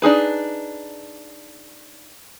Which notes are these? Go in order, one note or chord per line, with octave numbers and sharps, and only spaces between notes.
D4 D#4 G#4 B4